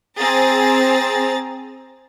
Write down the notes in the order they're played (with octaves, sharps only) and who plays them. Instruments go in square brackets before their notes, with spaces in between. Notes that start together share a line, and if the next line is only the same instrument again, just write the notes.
[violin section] C4 G#4 A#5 A6